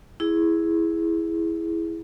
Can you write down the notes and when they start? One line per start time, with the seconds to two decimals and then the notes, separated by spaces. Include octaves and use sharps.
0.20 E4 G#4